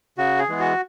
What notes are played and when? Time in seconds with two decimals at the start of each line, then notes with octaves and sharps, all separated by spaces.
0.18 C#3 F#4
0.39 G#4
0.49 E3 G#3 B3
0.59 F#4